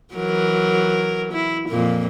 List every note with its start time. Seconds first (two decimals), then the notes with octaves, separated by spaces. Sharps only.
0.14 E3 F#3 A#4
1.32 E4
1.69 F2 A#2 A#3